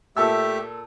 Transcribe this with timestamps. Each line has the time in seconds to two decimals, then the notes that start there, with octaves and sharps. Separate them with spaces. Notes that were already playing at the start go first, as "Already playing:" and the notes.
0.17 A#2 A3 G4 A4 E5 E6